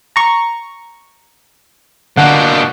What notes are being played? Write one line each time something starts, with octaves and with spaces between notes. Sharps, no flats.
A#5 C#6
B2 D3 A#3 D4 F#5 G6